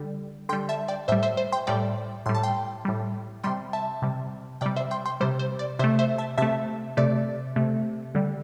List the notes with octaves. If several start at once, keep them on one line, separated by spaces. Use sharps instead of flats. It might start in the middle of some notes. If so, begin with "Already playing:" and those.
Already playing: D3 G3
D3 G3 G5 C6
E5 A5
D5 G5
A2 G3 C5 E5
C5 E5
C5
G5 C6
A2 G3 D5 G5
A2 G3 C6
A5
G5 C6
A2 G3
C3 G3 G5 C6
E5 A5
C3 G3
C3 G3 D5 G5
C5 E5
G5 C6
G5 C6
C3 G3 C5
C5
D5
C3 A3 C5 E5
C5 E5
E5 A5
C3 A3 E5 A5
C3 A3 D5
C3 A3
D3 G3